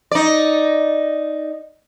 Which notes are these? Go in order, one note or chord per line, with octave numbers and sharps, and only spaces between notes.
D#4 D5